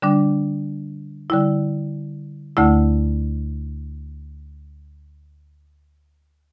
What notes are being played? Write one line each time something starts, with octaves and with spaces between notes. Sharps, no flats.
D3 G3 D4
D3 G3 E4
D2 D3 A3 E4